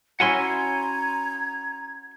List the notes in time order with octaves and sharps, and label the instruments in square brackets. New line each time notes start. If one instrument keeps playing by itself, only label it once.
[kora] C#4 E4 F#4 [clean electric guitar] F#5 G#5 C6 [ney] A#5 [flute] G#6